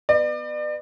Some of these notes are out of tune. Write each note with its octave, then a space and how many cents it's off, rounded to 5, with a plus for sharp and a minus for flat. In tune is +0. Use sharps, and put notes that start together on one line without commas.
B3 +0 D5 +35